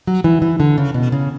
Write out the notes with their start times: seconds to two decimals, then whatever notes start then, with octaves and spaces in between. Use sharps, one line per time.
0.07 F#3
0.24 E3
0.42 E3
0.60 D3
0.78 C#3
0.94 B2
1.12 C#3